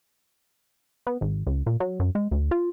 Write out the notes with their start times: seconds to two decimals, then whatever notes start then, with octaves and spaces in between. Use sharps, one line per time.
1.07 B3
1.21 G#1
1.47 C#2
1.66 A#2
1.80 F#3
2.00 F#2
2.15 G#3
2.31 D2
2.51 F4